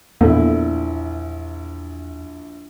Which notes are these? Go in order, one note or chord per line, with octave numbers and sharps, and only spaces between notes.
A#1 E2 A#3 B3 E4 A4